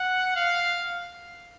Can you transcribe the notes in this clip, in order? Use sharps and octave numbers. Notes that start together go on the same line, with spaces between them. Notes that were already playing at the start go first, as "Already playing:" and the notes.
Already playing: F#5
F5